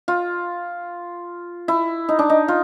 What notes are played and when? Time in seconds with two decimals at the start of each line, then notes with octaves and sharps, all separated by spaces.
0.08 F4
1.68 E4
2.09 D#4
2.19 D4
2.30 D#4
2.48 F4